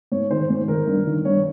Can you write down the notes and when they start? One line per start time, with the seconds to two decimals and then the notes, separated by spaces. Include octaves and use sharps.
0.12 G#2 C#5
0.31 D#3 C5
0.49 G#2
0.68 D#3 A#4
0.87 G2
1.06 D#3
1.25 G2 C#5